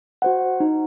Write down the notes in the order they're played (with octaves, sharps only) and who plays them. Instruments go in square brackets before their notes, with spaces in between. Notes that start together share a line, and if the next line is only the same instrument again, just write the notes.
[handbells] F#4 C5 F#5
D#4